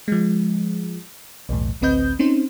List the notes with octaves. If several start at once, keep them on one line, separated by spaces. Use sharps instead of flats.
F3 G#3
B1 E2 A2
A1 D2 C4 B4 D#5 G6
C4 C#4 D#4 C5